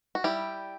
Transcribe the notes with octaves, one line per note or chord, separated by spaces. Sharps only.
F#4
G3 E4 G4